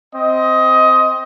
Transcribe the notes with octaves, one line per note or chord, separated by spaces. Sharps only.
C4 D#5